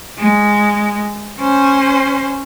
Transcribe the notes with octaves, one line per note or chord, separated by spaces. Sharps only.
G#3
C#4 C5